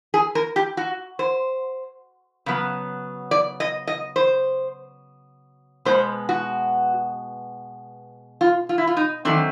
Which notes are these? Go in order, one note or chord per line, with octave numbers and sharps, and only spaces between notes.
G#4
A#4
G4
F#4
C5
C#3 F#3 B3
D5
D#5
D#5
C5
B2 G#3 B3 C5
F#4
F4
F4
E4
F4
D#4
D#3 F#3 A3 C4 D4